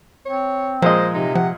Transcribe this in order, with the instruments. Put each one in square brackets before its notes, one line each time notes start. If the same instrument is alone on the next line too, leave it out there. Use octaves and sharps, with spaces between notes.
[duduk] C4 [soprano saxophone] C#5
[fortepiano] A#2 G#3 D#5 [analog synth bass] F3 [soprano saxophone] C5
[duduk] C3 [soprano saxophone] D#4
[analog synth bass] F3 [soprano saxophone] F#5